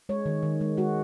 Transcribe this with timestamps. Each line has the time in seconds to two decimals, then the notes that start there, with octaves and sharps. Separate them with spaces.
0.09 G#3 C#5
0.26 D#3
0.43 D#3
0.61 G#3
0.77 G#3 F#4